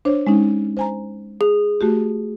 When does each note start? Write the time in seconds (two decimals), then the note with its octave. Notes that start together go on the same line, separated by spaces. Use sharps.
0.05 D4 C5 C#5
0.27 G#3 C#4 D#4
0.77 C5 G#5 A#5
1.41 G#4
1.81 A3 F#4 G4